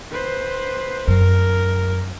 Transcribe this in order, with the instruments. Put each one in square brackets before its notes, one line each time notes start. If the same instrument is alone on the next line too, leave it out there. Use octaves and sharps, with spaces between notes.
[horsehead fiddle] B4 C5
[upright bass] F#2 [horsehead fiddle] A#4